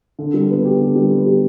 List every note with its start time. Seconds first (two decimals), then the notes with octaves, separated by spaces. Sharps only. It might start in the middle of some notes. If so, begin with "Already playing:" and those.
0.19 D3
0.34 G3
0.50 B3
0.65 G4
0.80 D3
0.95 G3
1.10 B3
1.26 G4